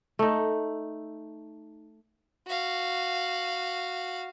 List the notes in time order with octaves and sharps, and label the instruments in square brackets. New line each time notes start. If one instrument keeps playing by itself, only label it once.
[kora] A3 D#4
[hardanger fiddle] F#4 F5